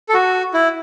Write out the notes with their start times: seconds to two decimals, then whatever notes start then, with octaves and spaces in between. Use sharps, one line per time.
0.09 A4
0.14 F#4
0.54 E4